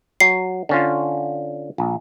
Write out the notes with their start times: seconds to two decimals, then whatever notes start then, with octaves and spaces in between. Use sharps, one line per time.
0.20 F#3 C7
0.69 D3 C#4 F4
1.78 A#1